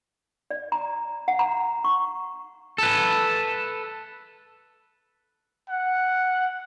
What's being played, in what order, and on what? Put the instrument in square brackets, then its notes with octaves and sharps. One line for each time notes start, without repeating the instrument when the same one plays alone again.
[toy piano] D5
A#5
F#5
A#5
C#6
[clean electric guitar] A4 B4
[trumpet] F#5